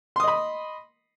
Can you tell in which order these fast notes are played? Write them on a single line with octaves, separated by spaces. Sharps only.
C6 D#6 D#5 B5